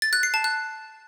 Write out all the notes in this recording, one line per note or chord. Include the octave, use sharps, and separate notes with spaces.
A6
F#6
C7
A5
F#6